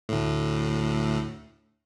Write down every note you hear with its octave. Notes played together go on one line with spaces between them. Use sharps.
D2 A2